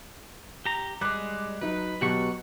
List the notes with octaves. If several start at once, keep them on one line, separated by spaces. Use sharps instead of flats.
G4 A#5
G3 G#3 D6 F#6
F#3 D#4 B4
B2 F#3 G4 B4 F#5 C#6